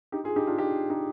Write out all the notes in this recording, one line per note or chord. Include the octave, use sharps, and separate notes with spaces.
D#4 G4
F4 G#4
D#4 G4
D4 F4
D#4 G4
D#4 G4